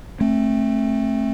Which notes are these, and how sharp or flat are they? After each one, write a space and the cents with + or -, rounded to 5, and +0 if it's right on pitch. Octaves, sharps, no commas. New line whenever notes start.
A3 -5 C4 +30